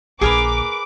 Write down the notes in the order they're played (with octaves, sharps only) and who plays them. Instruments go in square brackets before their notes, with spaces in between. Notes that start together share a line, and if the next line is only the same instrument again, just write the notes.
[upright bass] A#1 D3 [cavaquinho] G#4 A#4 B4 [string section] D6